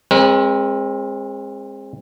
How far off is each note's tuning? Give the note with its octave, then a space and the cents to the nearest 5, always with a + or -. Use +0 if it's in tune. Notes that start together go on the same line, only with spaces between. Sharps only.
G#3 -20 C4 +30 A#4 +45